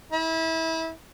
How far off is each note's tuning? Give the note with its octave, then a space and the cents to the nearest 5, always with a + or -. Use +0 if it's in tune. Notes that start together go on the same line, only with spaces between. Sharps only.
E4 -25